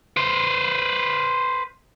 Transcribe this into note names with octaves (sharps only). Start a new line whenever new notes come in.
B4 C5